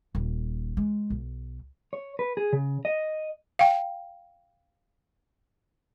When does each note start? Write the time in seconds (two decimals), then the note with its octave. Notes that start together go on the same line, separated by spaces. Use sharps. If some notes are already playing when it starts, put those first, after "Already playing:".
0.15 D#1
0.77 G#3
1.10 B1
1.93 C#5
2.19 B4
2.37 G#4
2.53 C#3
2.85 D#5
3.59 F5 G5